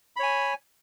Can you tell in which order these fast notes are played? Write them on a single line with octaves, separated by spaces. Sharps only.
B5 C#5 G#5